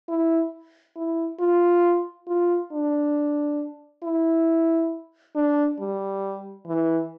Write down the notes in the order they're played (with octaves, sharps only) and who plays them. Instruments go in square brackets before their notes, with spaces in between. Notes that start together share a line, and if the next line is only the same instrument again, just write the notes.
[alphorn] E4
E4
F4
F4
D4
E4
D4
G3
E3